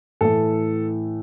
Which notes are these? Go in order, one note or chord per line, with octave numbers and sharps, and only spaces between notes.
A2 E3 A3 A4